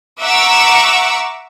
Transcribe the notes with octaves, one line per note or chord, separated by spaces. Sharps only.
E5 F#5 A#5 C#6 D6 E6